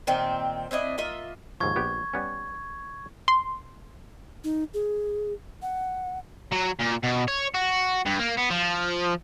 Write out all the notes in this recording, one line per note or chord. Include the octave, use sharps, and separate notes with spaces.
A#2 D#3 C4
C4 D4 E4 D#5
A#3 F4 D#5 E5
D#2 G#2 F3 C#6 G#6
A#1 B3 G4
G3 B3 C#4
C6
D#4
G#4
F#5
F#3
A#2
B2
C#5
F#4
G2
A#3
B3
F3